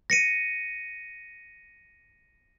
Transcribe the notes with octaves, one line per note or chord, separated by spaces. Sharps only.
A#6 C#7 D#7